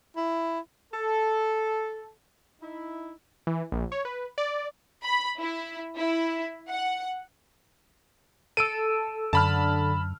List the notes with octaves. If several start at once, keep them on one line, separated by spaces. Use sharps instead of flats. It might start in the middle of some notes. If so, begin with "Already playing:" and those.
E4
A4
D#4 E4
E3
A#1
C#5
B4
D5
B5
E4
E4
F#5
A4 E6 D7 D#7
F#2 D3 A5 B5 F6